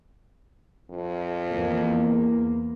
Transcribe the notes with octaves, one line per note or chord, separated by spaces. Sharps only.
F2
E2 A#3